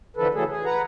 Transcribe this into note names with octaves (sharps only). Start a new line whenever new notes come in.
D3 E3 F3 A4 B4
C#3 E3 F#3 A3 G#4 A4
G#4
B4 F#5 A#5